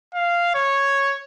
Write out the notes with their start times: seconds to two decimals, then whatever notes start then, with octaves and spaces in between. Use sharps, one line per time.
0.15 F5
0.55 C#5